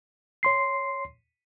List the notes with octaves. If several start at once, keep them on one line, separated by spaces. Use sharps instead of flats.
C#5 C6 C7